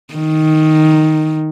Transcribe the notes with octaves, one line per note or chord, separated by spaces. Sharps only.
D#3